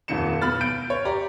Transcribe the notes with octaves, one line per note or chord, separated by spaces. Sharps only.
D#1 F2 D#4 C#7 E7
B2 B5 F6 A6
G6 D7
C#5
G4 D5 A#5